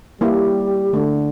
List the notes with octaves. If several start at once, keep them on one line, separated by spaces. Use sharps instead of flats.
G3 A#3 E4 G4
D3 A3